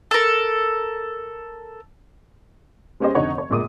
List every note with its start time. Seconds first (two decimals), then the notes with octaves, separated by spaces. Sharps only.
0.11 A4 A#4
3.00 G#3 B3 C#4 G4 C5 D#5
3.15 F1 D3 D#4 C#5 F#5
3.38 C#5
3.50 G1 A#2 G#3 D6 D#6 D#7